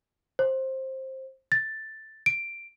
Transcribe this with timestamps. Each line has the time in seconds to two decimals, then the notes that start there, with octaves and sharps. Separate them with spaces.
0.39 C5
1.52 A6
2.26 D7